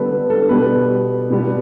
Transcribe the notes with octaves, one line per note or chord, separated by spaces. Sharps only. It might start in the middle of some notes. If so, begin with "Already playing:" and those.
Already playing: D3 G3 B3 A4 B4
A4
B2 G3 B3 B4
B2 G3 B3